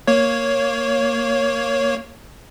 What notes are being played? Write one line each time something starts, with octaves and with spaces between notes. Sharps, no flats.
A#3 C#5